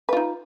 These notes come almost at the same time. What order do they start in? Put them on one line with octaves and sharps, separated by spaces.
B4 F4 D#4